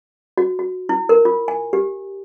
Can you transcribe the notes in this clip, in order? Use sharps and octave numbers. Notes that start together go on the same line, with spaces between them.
F#4
F#4
E4
A#4
F4
G#5
G4